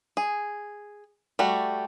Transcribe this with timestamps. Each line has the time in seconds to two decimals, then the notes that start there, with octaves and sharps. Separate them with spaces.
0.17 G#4
1.39 G3 A3 F#4